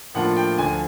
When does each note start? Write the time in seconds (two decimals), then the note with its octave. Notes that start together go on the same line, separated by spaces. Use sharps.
0.14 A2 F3 A#3 D4 F4 F#5
0.36 G5
0.57 D2 D3 F3 G#5